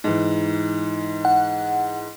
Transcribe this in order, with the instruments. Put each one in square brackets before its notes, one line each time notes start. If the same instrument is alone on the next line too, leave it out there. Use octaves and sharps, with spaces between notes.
[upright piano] G#2 E3
[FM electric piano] F#5